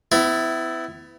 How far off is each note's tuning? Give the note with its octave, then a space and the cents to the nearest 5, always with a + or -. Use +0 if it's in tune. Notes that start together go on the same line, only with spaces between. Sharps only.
B3 +40 E4 +0